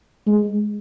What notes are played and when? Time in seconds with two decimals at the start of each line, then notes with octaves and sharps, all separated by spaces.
0.27 G#3